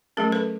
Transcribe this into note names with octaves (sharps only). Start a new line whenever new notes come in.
F#3 A3 C#4 G#4 A#4
A4 B4